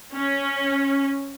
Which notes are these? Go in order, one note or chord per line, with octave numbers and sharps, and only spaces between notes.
C#4